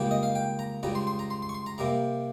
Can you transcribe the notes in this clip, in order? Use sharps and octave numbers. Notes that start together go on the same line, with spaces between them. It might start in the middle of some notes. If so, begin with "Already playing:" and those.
Already playing: C#2 C#3 G3 A#3 G5
D#5
F5
G5
A#5
C#2 C#3 G3 A#5
C6
C6
A#5
C6
C6
C#6
C6
A#5
C3 G3 A#3 A#5